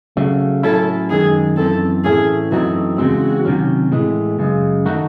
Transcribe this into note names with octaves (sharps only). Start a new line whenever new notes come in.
C#3 F#3 A3
A2 F#3 C#4 E4 A4
F#2 D#3 G#3 G#4
F#2 E3 C4 A4
A2 E3 A3 C#4 G#4
F#2 E3 A3 C4 D#4 F#4
E2 C#3 G#3 C4 F#4
C3 D#3 F#3 C#4
A2 E3 G#3
F#2 C#3 G#3
D#3 A3 D#4 F#4